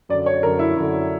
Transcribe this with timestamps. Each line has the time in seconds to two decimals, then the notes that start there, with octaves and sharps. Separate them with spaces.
0.09 F#2 D5
0.14 D3
0.26 C#5
0.43 F#2 D3 A#4
0.59 E4
0.76 F#2 D3